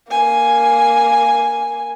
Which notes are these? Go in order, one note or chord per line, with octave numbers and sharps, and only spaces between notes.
A#3 G#5